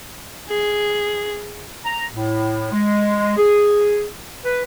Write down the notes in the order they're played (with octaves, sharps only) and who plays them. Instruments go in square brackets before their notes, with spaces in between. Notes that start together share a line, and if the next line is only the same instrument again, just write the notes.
[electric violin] G#4
[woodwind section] A#5
A2
G#3
G#4
B4